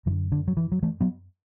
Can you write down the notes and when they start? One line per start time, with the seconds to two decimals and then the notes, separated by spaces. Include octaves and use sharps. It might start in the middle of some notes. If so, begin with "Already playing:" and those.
0.06 F#2 E3
0.10 D3
0.32 D3
0.48 F#3
0.57 E3
0.72 F#3
0.83 E3 A3
1.01 F#3 B3